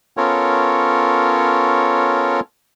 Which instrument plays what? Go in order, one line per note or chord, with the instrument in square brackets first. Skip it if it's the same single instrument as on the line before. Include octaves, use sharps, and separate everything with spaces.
[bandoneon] B3 C#4 F4 A4 A#4 C#5